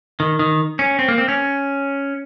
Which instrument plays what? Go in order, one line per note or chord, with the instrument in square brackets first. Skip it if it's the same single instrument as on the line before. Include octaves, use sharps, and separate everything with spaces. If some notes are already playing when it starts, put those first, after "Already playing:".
[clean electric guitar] D#3
D#3
C#4
C4
A#3
C4
C#4